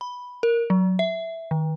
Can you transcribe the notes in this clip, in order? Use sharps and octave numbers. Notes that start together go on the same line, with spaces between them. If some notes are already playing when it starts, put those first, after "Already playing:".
B5
A#4
F#3
E5
D#3